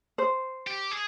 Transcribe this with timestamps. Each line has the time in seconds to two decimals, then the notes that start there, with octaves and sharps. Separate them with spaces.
0.18 C5
0.67 G4
0.92 G#4